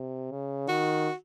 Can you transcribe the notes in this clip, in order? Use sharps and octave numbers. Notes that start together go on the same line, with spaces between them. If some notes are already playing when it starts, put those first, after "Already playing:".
Already playing: C3
C#3
D#3 F#4